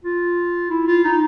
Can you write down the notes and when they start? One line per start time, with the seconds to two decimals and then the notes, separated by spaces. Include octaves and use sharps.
0.04 F4
0.70 E4
0.87 F4
1.04 D#4